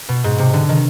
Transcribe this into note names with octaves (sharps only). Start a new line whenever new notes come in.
B2
G#2
C3
D3
D#3